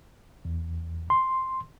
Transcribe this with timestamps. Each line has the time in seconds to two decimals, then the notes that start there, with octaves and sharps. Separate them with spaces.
0.45 E2
1.10 C6